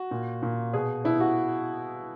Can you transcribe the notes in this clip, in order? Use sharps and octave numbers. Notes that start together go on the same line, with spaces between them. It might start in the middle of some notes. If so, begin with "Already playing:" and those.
Already playing: F#4
A#2
A#2
B2 G#4
B2 E4
F#4